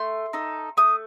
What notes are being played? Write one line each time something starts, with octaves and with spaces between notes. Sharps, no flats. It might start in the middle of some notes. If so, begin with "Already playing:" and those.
Already playing: A3 C6
D#4 A4
A3 D#6